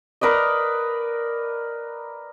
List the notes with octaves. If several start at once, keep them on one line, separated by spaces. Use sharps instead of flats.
A#4 B4 D5 D#5